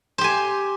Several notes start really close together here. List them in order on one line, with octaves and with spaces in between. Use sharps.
C5 G4 G#5